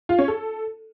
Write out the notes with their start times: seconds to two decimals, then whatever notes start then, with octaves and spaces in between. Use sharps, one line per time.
0.09 F4
0.19 C#4
0.28 A4